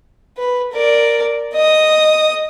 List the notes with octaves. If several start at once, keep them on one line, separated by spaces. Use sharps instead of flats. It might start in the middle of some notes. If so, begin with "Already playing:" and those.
B4
A#4 D5
D#5 D#6